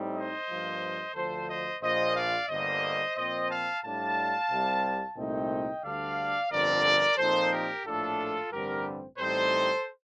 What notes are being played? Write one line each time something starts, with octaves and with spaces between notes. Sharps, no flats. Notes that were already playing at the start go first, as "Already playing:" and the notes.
Already playing: A2 G3 C4 D#4
C5 D#5
G2 F3 A#3
D2 D3 F3 A4 C5
C5 D#5
A#1 A#2 F3 C5 D#5
D5 F5
G1 G2 D3 G3 A#3 C5 D#5
A#2 F3 C4 C5 D#5
F5 A5
A2 G3 D4 F5 A5
C2 C3 G3
C2 A#2 A3 C4 D#4 D#5 G5
D2 D3 G3 D4 D5 F5
G1 F2 D3 F3 C4 A#4 D5
A#2 F3 C4 D#4 A4 C5
G4 A#4
A#1 A2 A3 D4 F4 A4
A1 G2 D3 G3 C4 G4 A#4
A1 A2 G3 C4 D#4 A4 C5